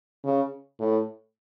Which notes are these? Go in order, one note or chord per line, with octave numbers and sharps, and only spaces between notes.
C#3
A2